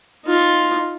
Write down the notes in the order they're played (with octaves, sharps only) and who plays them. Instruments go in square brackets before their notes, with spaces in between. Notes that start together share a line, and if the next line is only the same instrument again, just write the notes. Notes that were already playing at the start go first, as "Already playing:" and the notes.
[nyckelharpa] D#4 F4